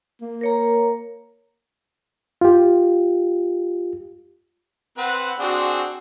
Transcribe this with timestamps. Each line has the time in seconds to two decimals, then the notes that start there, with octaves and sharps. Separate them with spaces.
0.21 A#3
0.41 A#4 C#5 A#5
2.41 F4 G4
4.98 C4 B4 F#5
5.39 C4 D4 F#4 G#4